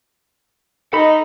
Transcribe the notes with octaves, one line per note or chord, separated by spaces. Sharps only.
D#4 A4 D#5 B5